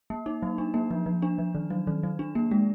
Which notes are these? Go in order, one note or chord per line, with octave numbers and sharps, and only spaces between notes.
A#3
D#4
F#3
D4
A#3
F3
F3
D4
F3
D#3
F#3
D#3
F#3
D4
A#3
G#3